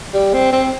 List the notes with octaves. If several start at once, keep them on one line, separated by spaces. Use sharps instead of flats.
G3
C4
C4